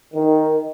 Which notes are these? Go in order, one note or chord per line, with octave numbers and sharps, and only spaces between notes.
D#3